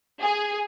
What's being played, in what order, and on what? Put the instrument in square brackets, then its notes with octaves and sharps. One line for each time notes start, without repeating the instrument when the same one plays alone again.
[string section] G#4